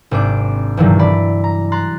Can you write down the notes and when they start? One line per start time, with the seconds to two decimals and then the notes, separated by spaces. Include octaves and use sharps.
0.11 G#1 C3 D4 D6
0.77 A#1 G2 C3 D#3 E3 F#3
0.99 D5 B5
1.44 A#5
1.72 A#5 C6 F#6 A6